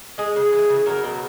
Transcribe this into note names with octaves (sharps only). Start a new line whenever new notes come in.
G#3 G#4
C#3
E3
C#3
F#3 A#4
B2